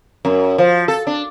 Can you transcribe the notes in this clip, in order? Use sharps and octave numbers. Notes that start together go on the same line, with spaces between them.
F#2
F3
A4
D4